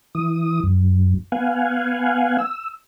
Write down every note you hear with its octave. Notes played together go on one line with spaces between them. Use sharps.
E3 D#6
F#2
B3 F5 F#5 G#5
E6